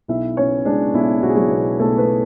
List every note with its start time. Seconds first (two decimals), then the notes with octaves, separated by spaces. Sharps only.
0.08 B1 E4 E5
0.37 B2 C#4 C#5
0.65 G#3 D4
0.94 B1 E4
1.23 B1 F#4
1.29 G#4
1.36 F#3 F#4
1.51 B2
1.79 B1 A3 A4
1.98 B3 B4